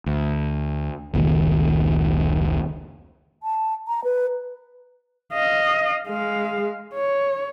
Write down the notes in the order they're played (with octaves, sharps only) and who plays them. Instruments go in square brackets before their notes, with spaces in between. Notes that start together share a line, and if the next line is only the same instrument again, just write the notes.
[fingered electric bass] D2
F1 C#2 A#2 D#3
[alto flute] A5
A#5
B4
[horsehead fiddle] D#5 F5
G#3 F5
C#5